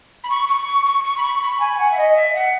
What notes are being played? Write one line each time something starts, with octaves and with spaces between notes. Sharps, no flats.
B5
C#6
C#6
C#6
C#6
C#6
B5
C#6
B5
G#5
F#5
E5
D#5
E5
F#5